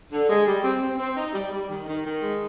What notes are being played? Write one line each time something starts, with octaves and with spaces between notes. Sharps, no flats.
D3
G#3
G3
C4
C4
C4
D#4
G3
G3
D#3
D#3
D#3
G#3